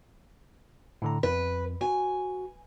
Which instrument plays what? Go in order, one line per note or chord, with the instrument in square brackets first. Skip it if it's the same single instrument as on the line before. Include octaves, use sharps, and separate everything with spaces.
[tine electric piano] A2 D3 A#5
[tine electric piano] F2 [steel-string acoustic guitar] B4
[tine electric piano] F#4 [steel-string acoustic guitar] G#5